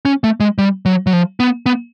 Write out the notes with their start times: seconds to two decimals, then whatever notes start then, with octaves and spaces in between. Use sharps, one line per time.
0.05 C#4
0.24 A3
0.40 G#3
0.58 G3
0.86 F#3
1.07 F#3
1.13 F3
1.40 B3
1.66 B3